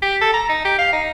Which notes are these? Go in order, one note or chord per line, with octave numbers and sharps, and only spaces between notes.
G4
A4
A#5
D#4
G4
F5
D#4